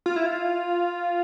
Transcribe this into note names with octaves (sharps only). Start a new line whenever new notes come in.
F4
E4
F4